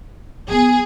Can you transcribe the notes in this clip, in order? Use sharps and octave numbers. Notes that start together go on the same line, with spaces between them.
F#3 B3 G#4